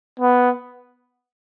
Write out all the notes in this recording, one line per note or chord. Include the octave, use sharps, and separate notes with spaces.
B3